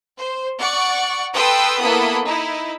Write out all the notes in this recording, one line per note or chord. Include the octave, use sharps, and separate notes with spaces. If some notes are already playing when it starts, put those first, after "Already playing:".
C5
D5 F#5 C#6
A4 B4 G5 C6 D#6 E6
A#3 B3 E4 A4 B5 D#6
D#4 E4